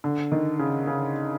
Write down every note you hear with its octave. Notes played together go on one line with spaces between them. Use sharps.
D3
D#3
C#3
C#3